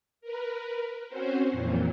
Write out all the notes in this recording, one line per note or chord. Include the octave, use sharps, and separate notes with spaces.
A#4 B4
C4 C#4 F#4 C5
F2 A#2 E3 F#3